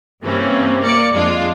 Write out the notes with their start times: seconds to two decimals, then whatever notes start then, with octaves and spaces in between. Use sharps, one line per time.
0.22 G2 C3 E3 A#3 C4 C#4
0.81 A#3 A#4 D5 D6 C#7
1.11 F2 G#3 D4 F4